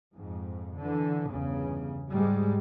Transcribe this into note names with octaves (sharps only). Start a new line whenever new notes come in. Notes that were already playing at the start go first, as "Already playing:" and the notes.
F2 G#2
D3 E3
G1 E2 C#3
G#2 G3 G#3